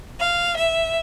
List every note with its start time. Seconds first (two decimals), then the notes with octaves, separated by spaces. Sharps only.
0.19 F5
0.56 E5